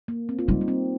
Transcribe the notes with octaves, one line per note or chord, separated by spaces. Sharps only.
A#3
C4
F4
G3 D#4
A#3
C4